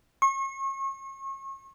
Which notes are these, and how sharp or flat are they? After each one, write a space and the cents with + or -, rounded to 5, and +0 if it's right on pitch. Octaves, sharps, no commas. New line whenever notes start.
C#6 -35